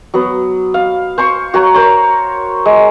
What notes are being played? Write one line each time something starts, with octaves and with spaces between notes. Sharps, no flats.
F#3 B3
F5
C5 C6 C#6
F#4 C#5 A#5
A#4 C5 C#5
G#3